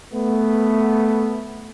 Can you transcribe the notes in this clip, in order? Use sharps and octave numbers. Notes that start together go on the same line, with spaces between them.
A3 B3